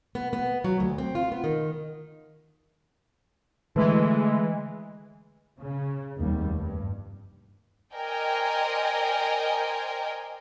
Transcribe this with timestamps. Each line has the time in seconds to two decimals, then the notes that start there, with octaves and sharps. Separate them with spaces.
0.15 B3
0.33 B3
0.64 F#3
0.80 D2
0.98 C4
1.15 F4
1.32 B3
1.44 D#3
3.76 D3 E3 G#3 A3
5.60 C#3
6.18 F1 D#2 G3
6.56 G2
7.94 A#4 C5 D5 D#5 G5 G#5